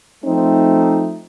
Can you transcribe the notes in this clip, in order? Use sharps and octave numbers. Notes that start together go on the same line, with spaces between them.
F3 A3 C4 D#4